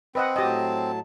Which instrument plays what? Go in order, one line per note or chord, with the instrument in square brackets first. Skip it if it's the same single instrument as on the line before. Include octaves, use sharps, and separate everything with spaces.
[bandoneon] C4 [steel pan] B4 D#5 F#5
[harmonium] A2 F#3 A5 [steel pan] G4 D#5